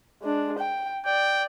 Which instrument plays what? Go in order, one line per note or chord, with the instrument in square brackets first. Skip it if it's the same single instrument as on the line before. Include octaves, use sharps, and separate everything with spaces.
[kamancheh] G#3 D4
G5
[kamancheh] D5 [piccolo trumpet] G5